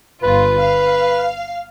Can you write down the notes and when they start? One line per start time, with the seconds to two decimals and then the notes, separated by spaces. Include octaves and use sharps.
0.23 G1 F4 B4
0.60 F5